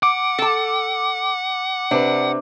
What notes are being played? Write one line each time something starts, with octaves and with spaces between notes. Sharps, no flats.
F#5 D6
A4 A5
C3 D4 B4